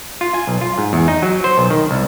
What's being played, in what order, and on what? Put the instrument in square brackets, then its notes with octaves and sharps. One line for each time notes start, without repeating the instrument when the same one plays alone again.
[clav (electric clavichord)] F4
G#5
B1
F4
G#2
E2
D#4
F#3
C5
B1
D#3
C2